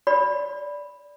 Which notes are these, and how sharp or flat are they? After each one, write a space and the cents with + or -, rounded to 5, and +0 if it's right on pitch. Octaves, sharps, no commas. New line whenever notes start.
D5 -15 B5 +0